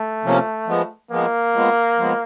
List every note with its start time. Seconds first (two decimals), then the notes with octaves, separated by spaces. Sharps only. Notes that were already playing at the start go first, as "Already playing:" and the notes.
Already playing: A3
0.24 C3 F3 A#3 C#4
0.67 F3 G#3 B3
1.11 F3 G#3 A#3 B3
1.54 F3 G#3 B3
1.98 F3 G#3 B3